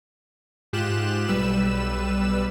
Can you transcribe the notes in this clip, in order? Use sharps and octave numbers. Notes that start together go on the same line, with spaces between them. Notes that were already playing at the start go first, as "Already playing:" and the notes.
G#2 F4 G4 F#6 E7
B1 G3 B4 E6 E7